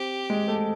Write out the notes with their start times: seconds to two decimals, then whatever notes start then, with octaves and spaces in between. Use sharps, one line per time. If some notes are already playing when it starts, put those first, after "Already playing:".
Already playing: C4 G4
0.30 G#3
0.48 A3